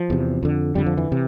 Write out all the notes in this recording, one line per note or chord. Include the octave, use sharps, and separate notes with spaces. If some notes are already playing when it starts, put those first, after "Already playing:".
Already playing: F3
E2 C3
F2 D3
F2 D3 G3
F3
E3
C3